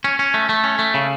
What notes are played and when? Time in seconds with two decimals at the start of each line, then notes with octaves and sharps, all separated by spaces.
0.04 C#4
0.19 C#4
0.34 A3
0.49 A3
0.64 C#4
0.79 A3
0.94 C#3